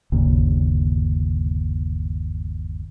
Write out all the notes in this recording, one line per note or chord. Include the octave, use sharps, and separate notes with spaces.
G1 D#2 A#2 C#3